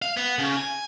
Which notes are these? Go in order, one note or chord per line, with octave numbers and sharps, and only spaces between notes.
F5
B3
C#3
G#5